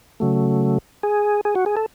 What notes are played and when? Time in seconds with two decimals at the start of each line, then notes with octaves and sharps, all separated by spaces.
0.20 C#3 F#3 A3
1.03 G#4
1.45 G#4
1.55 F#4
1.66 G#4
1.77 A4